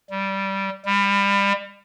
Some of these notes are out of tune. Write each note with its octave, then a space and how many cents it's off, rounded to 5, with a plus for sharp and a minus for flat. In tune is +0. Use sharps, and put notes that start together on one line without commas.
G3 -10
G3 +30